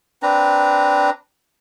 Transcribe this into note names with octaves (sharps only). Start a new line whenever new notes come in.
C4 D4 B4 A#5